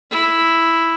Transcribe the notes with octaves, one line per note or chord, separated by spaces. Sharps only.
E4